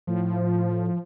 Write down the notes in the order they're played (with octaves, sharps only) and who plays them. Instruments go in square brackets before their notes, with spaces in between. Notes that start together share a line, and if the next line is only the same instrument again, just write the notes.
[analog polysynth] A2 [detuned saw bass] F3